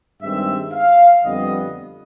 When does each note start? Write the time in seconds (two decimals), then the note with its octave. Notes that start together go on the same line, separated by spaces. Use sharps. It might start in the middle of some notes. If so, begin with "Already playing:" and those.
0.20 G2 D#3 G#3 C4 E5
0.72 F5
1.23 F2 D3 G3 B3 D#5